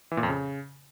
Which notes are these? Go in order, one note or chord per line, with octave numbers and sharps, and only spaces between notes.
E3
A#2
F2
C#3